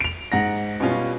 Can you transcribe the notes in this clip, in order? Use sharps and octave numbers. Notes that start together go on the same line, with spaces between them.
D7 F7
G#2 F#5 A#6
B2 G3 C#4 F4